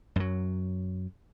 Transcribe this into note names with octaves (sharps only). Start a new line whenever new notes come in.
F#2 F#3